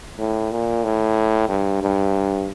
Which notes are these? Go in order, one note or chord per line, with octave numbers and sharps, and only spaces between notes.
A2
A#2
A2
G2
G2